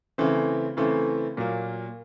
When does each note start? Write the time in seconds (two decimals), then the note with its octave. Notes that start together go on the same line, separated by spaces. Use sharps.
0.18 C#3 E3 A3 C4
0.77 C#3 E3 A3 C4
1.37 A#2 F#3 A#3